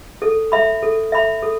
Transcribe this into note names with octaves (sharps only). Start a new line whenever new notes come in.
A4
E5 B5
A4
E5 B5
A4